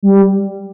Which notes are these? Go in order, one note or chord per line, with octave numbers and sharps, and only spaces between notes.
G3